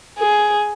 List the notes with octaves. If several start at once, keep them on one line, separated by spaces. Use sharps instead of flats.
G#4